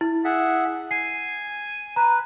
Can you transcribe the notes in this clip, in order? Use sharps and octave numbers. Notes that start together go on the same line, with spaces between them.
E4
G#4 E5 F#5
G#5 C7
B4 A#5